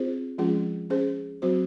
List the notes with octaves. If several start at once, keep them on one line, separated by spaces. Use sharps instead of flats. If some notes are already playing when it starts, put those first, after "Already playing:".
Already playing: C4 F4 G#4 C5
F3 G#3 C#4 F4 G#4
C#4 G#4 C5
F#3 C4 F#4 C5